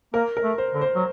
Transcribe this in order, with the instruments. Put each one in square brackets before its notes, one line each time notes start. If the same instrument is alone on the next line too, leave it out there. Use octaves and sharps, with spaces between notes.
[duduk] A#3 [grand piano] A#4
[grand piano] A#4
[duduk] A3
[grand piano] C5
[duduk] D3
[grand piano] C5
[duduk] F#3